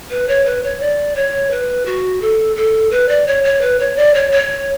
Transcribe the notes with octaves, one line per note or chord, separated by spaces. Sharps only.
B4
C#5
B4
C#5
D5
C#5
B4
F#4
A4
A4
B4
D5
C#5
C#5
B4
C#5
D5
C#5
C#5